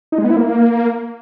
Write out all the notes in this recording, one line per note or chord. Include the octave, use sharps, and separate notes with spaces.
D#4
G#3
B3
E4
A#3